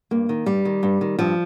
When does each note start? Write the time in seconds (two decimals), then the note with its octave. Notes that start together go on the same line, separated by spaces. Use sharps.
0.11 G2 A#3
0.29 D#3
0.46 G2 G3
0.65 D#3
0.83 G2
1.01 D#3
1.19 G2 F3